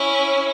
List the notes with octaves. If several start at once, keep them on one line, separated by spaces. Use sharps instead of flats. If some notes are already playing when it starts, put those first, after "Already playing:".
Already playing: C#4 E4